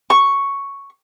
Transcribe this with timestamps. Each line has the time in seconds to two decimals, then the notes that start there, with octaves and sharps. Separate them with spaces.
0.10 C#6